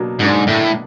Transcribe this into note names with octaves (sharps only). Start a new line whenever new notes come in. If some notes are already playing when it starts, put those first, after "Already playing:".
Already playing: B2 F#3 A#3 D4
G#2 B2 F#3 A#3 D4
A2